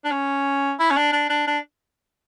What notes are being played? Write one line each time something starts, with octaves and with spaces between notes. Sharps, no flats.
D4
C#4
E4
C#4
D4
D4
D4
D4